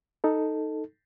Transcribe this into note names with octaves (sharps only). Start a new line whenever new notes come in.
D#4 A4